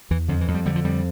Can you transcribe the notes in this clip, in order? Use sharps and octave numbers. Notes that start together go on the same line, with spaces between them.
E2 E3
F2 D3
E3
F2
G3
D3 G3
F3
F2 G3